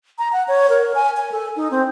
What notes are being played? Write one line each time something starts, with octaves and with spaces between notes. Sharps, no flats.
A#5
F#5
C#5
A#4
G#5
G#5
A4
D#4
C4